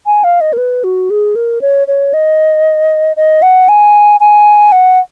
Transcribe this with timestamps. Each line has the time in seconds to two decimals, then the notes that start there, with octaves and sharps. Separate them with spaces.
0.06 G#5
0.24 F5
0.41 D#5
0.53 A#4
0.58 B4
0.84 F#4
1.10 G#4
1.35 A#4
1.61 C#5
1.88 C#5
2.13 D#5
3.17 D#5
3.42 F#5
3.69 G#5
4.20 G#5
4.72 F#5